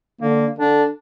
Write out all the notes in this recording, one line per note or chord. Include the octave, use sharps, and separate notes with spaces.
D3 A#3
D3 D4